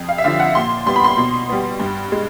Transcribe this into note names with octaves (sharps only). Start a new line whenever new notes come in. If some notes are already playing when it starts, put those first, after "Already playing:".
Already playing: F2
F5
E5
D3 F3 F5
F#5
A#2 C6
G3 B3 C6
B5
C6
B2
G3 B3
G2
G#3